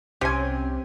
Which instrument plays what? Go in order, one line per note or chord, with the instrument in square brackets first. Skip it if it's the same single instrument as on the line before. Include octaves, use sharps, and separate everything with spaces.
[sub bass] C2 [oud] C3 [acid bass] C#4 [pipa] G4 G#5